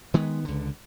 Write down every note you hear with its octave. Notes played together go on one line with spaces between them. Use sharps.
D#3 G#3 B3
C#2 D3